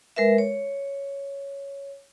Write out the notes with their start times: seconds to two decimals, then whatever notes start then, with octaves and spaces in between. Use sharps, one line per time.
0.16 G#3 A#4 B4 E5
0.38 C#5